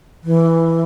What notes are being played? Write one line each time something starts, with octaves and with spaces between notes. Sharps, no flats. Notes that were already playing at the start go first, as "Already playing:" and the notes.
E3